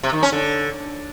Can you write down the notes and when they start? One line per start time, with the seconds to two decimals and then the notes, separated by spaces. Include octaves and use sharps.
0.03 C3
0.13 D#3
0.23 C#4
0.32 D3